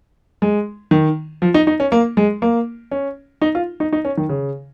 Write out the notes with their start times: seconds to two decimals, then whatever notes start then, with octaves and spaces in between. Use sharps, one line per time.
0.42 G#3
0.91 D#3
1.42 F3
1.54 D#4
1.67 D#4
1.80 C#4
1.92 A#3
2.17 G#3
2.42 A#3
2.91 C#4
3.42 D#4
3.55 F4
3.80 D#4
3.93 D#4
4.05 C#4
4.17 D#3
4.29 C#3